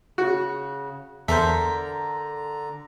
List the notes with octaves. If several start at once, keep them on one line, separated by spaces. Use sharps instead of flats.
C#3 F#4
E2 D3 A4 A#4 C5 E5 A#5 B6